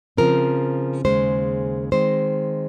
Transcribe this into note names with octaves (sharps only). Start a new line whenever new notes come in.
C#3 F3 C4 A#4
D#2 C#3 G#3 C5
D#3 G#3 C4 C5